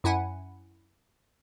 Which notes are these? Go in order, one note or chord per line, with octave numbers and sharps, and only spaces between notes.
F#2 E4 F#5 G#5